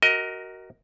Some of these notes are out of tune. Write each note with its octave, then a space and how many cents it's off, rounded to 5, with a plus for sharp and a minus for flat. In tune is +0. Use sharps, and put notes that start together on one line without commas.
F#4 +20 A#4 +0 D#5 +20